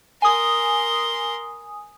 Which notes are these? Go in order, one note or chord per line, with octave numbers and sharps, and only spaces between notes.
A#4 G#5 C6 D#6